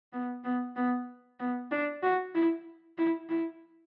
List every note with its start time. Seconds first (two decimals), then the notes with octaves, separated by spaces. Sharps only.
0.13 B3
0.44 B3
0.76 B3
1.40 B3
1.71 D4
2.03 F#4
2.35 E4
2.98 E4
3.29 E4